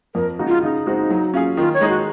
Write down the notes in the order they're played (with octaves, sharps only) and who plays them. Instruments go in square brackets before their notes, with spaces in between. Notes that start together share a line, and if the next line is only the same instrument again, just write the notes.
[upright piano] F2 [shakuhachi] A#4
[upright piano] C#3 G#3 D#4 F#4
[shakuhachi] F4
[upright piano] C#3 [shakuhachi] D#4
[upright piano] G#3 C4 F#4
F#3
C#4 F4 G#4
[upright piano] D#3 [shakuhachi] F4
[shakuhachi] C#5
[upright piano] G#3 D#4 G#4
[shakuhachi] F#4